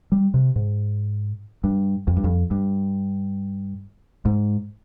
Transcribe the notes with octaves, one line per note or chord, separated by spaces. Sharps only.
G3
C3
G#2
G2
F2
G2
F2
G2
G#2